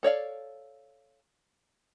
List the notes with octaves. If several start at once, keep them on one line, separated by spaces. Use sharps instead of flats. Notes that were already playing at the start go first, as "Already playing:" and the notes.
A4 C#5 D5 F5